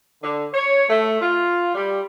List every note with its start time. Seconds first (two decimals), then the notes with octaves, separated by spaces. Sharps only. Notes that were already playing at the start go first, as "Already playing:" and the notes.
0.22 D3
0.54 C#5
0.89 A3
1.22 F4
1.75 G3